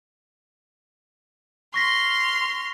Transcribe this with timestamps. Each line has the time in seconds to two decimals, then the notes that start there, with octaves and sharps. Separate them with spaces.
1.74 C6 C#6 F6 A#6 B6